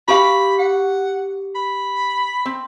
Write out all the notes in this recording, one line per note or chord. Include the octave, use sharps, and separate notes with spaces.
F#4 G4 F5 B5
F#5
B5
C4